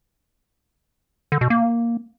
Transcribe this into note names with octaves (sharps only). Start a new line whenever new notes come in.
D3
B2
A#3